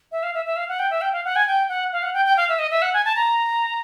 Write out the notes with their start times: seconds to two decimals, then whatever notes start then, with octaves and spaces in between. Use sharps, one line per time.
0.12 E5
0.23 F5
0.34 E5
0.45 E5
0.56 F5
0.69 F#5
0.79 G5
0.91 E5
1.01 G5
1.13 F5
1.25 F#5
1.36 G#5
1.47 G5
1.69 F#5
1.93 F5
2.03 F#5
2.14 G5
2.25 G5
2.37 F5
2.49 E5
2.59 D#5
2.71 E5
2.82 F#5
2.94 G#5
3.05 A5
3.16 A#5